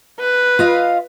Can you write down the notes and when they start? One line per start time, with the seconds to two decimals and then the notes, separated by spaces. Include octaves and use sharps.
0.20 B4
0.59 F4 D#5 F5